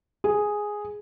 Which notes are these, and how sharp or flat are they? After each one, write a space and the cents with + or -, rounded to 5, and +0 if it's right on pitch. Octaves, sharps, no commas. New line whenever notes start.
G#4 +0